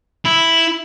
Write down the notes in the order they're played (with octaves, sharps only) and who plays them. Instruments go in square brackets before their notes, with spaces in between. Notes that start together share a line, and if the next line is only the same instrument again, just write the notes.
[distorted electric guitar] E4